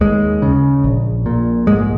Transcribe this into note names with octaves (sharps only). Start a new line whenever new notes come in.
D#2 G#3
C#3
A#1
A#2
G#2 G#3